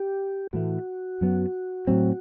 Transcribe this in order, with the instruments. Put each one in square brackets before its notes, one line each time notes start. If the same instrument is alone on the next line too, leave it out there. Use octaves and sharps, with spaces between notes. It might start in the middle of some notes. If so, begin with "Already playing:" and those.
Already playing: [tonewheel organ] G4
[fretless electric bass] A2 E3 A3 [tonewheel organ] F#4
[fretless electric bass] F#2 F#3 B3
A2 F#3 C4